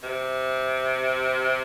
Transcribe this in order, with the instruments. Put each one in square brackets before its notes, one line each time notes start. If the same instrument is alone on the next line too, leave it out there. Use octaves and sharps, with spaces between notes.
[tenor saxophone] C3